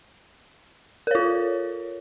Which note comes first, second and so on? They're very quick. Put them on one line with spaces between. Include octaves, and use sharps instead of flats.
A#4 C#5 F4